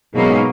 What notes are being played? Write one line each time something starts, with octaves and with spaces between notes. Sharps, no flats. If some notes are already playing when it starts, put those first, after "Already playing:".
G#2 B2 F#3 G#3 A#3 C#4